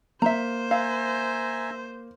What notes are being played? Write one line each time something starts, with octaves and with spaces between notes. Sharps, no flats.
A#3 C5 E5 A#5
E5 F5 G#5 A#5